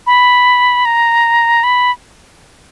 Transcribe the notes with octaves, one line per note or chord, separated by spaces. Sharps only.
B5
A#5
B5